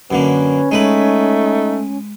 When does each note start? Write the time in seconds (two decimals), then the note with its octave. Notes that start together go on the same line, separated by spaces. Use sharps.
0.11 F#2 D3 A#3 C#4 B4
0.71 G#3 A3 D#4 B4 B5